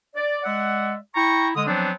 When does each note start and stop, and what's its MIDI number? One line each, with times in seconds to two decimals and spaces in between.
0.15 0.40 74
0.44 0.94 56
0.44 0.94 74
0.44 0.94 76
0.44 0.94 78
1.15 1.49 64
1.15 1.49 79
1.15 1.49 82
1.15 1.49 85
1.56 1.64 50
1.56 1.64 56
1.56 1.64 87
1.67 1.91 53
1.67 1.91 54
1.67 1.91 59
1.67 1.91 60
1.67 1.91 62